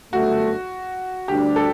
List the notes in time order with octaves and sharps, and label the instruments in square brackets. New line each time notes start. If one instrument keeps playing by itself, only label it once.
[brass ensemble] G1 F#2 D3 A3 [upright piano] F#4
[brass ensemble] D2 D3 G3 D4 [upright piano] G4
[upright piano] A4